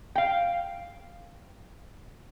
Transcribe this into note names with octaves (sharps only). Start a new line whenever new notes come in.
F5 G5